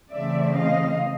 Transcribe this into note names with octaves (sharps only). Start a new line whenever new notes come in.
C#3 E3 A3 C4 D5 E5
D#5 F5